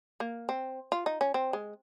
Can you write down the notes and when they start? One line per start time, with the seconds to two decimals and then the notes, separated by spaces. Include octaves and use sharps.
0.20 A#3
0.49 C4
0.92 F4
1.06 D#4
1.21 C#4
1.34 C4
1.53 G#3